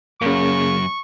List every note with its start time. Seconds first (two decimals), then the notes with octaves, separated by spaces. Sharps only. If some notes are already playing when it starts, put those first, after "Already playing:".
0.21 F#2 C#3 A#3 C#6